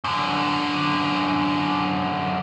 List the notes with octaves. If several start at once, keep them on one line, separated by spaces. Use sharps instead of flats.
F#2 D3